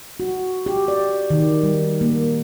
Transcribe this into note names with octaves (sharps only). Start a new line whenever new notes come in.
F#4
G4
D5
D#3
G3
A#3